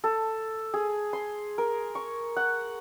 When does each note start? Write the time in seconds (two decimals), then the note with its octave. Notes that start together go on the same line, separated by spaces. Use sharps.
0.04 A4
0.74 G#4
1.13 C6
1.58 A#4
1.95 C#6
2.36 F#5